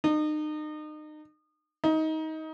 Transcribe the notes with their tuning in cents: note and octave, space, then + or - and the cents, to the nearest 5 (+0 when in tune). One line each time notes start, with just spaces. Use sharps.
D#4 -35
D#4 +20